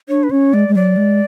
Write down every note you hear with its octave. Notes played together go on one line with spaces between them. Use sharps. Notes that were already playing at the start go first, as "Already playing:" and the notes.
D4 C#5
B4
C#4 C#5
G#3 D5
G#3
F#3 D5
G#3